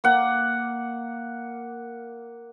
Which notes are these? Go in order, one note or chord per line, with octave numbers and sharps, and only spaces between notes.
A#3 F#5